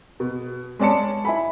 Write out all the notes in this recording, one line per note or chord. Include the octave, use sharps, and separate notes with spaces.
B2
G#3 C#4 D5 A5 C#7
E4 G#5 B5